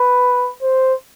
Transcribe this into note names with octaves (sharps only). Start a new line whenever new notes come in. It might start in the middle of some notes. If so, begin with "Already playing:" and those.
Already playing: B4
C5